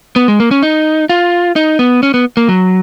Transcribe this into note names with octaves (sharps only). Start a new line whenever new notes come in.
B3
G#3
A#3
C#4
D#4
F4
D#4
B3
C#4
B3
A#3
F#3